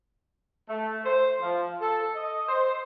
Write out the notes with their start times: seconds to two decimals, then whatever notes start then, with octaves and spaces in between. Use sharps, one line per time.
0.69 A3
1.04 C5
1.42 F3
1.81 A4
2.15 D#5
2.48 C5